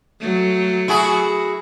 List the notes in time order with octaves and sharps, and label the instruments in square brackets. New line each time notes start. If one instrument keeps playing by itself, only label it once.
[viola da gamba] F#3 A3
[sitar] E4 F#4 G#4